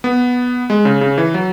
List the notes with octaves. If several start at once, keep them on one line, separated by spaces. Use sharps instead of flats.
B3
G#3
C#3
C#3
E3
F#3